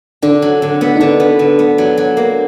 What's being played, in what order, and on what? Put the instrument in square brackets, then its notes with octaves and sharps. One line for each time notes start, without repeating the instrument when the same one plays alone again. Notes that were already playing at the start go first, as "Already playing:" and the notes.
[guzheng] D3 [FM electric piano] D4
[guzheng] F#3
D3
B3
[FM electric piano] D#4
[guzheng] D3 [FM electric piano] D4
[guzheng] B3
D3
B3
[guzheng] F#3 [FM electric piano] D4
[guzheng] F#3
A#3